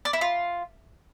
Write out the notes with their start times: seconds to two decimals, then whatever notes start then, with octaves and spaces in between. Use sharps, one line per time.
0.05 D5
0.13 E4
0.21 F4